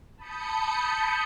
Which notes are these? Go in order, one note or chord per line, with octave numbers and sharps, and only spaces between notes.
A5 B5 D#6 G6 C#7